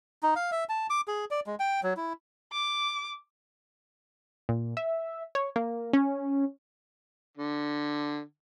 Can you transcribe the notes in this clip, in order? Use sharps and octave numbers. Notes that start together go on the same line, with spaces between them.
D#4
F5
E5
A5
D6
G#4
D5
G#3
G5
F#3
E4
D6
A#2
E5
C#5
A#3
C#4
D3